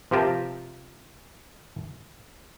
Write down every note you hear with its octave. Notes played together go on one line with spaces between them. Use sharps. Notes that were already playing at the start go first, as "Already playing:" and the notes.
C3 F3 F4 G4 A#4 A5